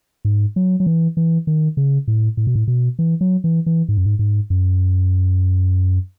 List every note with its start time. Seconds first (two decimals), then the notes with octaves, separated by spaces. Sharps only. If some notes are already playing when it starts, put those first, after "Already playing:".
0.25 G#2
0.56 F#3
0.80 F#3
0.86 E3
1.17 E3
1.47 D#3
1.77 C#3
2.08 A2
2.37 A2
2.47 B2
2.55 A2
2.68 B2
2.99 E3
3.21 F#3
3.44 E3
3.66 E3
3.89 G#2
3.97 F#2
4.06 G#2
4.19 G#2
4.50 F#2